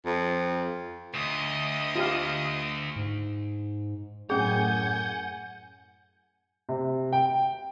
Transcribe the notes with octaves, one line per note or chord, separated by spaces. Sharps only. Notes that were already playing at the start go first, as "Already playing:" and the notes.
F2
D2 D#5 D#6
F4 G4 F5
G#2
F#2 A2 C#4 G#4 F#5 G#5 G6
C3
G5